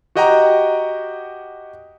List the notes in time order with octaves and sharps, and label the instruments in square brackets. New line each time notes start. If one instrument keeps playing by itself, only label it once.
[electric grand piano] F#4 G4 D#5 F#5 G5 A#5